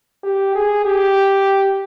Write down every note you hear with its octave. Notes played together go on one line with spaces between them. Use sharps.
G4
G#4
G4